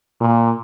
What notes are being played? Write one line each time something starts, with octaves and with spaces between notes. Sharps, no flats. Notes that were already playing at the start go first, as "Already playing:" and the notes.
A#2